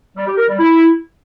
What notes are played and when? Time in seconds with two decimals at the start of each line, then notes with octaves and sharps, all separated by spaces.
0.16 G3
0.26 G4
0.37 A#4
0.48 G3
0.58 E4